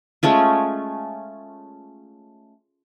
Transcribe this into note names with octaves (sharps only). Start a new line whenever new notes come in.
G#3 A3 C#4 F4